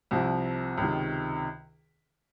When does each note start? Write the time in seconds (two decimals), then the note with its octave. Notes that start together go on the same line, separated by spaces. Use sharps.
0.11 C2 C3 F3
0.78 C#2 C3 D#3